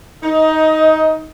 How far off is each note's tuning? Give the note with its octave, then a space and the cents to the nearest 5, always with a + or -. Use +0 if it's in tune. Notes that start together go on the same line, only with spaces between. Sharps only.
D#4 +15 D#5 +25